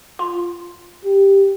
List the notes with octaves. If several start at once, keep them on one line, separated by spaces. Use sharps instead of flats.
F4
G4